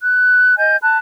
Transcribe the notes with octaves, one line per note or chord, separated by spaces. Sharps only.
F#6
D#5 G#5 G6
A5 B5 F#6